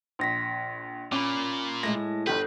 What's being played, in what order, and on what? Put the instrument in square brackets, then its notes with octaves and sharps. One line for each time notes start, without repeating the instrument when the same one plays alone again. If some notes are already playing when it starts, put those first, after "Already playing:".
[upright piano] A#1 [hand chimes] C6 A#6 B6
[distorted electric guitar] A#2 [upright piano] C#4 [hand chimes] B5 D6
[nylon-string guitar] A2 G#3 A3 [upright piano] A#6
[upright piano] G1 G4 [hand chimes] A4 G6 [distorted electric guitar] B4